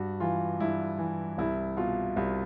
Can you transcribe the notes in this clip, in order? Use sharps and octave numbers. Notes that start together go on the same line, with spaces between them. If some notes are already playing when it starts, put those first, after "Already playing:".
Already playing: G2 F#4
E3 F4
G2 E4
E3
C2 E4
B2 F4
C2